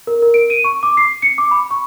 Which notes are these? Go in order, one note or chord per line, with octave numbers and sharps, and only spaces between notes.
A#4
A#4
D7
D#7
C#6
D6
C7
C#7
D6
B5
C#6